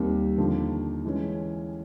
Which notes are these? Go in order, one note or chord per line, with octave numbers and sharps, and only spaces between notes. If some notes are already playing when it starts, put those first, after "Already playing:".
Already playing: D#2 D#3 G3 C4
D#2 D3 F3
E3 G#3 C#4